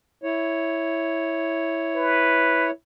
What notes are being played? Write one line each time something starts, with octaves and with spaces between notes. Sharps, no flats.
E4 C#5
B4